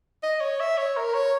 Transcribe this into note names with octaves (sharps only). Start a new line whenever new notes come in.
D#5
C#5
E5
C#5
A#4
C#5